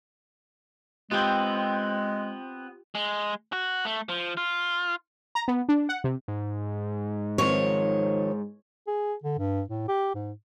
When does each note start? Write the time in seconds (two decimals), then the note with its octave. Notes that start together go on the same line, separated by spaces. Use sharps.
1.11 G#3 B3 C4 F4 G4 G5
2.95 G#3
3.53 F#4
3.85 A3
4.09 F3
4.37 F4
5.35 A#5
5.48 B3
5.69 D4
5.89 F#5
6.04 C3
6.28 G#2
7.38 D#3 F3 C4 C#5
8.87 G#4
9.24 D3
9.38 G2
9.69 A2
9.88 G4
10.15 G#2